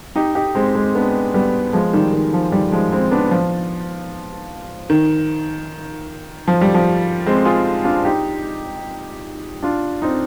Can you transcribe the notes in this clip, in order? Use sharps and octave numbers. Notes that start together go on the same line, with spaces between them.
D#4 G4
D#4 G4
G#3 C4
G#3 C4
B3 D4
G3 B3
F3 G#3
D#3 G3
D#3
F3
D#3 G3
F3 G#3
G#3 C4
B3 D4
F3
D#3
F3
G3
F3
G#3 C4
F4 G#4
D4 F4
D#4 G4
D4 F4
C4 D#4